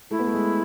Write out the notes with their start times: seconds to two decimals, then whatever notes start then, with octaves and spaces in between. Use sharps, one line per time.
0.11 A3 E4
0.19 B3
0.27 A3
0.34 G#3